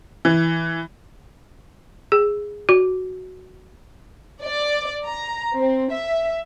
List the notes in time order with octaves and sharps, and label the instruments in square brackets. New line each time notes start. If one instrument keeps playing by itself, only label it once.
[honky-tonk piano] E3
[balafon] G#4
F#4
[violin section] D5
A#5
C4
E5